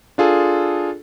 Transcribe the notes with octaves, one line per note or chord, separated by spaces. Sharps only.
D4 F4 G#4 A4